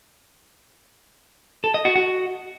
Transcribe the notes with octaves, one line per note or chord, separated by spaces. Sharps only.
A4
D#5
F#4
F#4